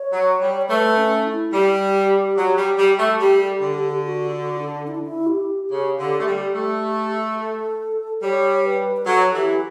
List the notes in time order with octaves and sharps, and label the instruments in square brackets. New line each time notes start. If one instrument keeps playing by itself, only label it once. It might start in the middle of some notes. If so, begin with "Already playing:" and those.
Already playing: [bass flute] C#5
[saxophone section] F#3
G3
[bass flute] C#5
[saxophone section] A3 [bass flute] B4
[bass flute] C#4
D4
E4
[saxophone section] G3 [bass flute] G4
[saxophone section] F#3
G3
G3
A3
[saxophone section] G3 [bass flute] G4
[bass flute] A4
G4
[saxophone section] D3
[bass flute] G4
G4
F#4
F#4
D4
E4
D4
E4
G4
[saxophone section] C#3
D3
A3
G3
A3
[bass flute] A4
[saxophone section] G3 [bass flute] C#5
[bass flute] B4
B4
[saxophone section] F#3 [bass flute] A4
[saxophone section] E3 [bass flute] G4